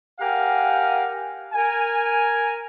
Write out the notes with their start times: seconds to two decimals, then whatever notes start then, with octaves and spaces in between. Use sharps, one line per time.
0.19 G4 A#4 F5 F#5 G#5
1.53 A#4 G#5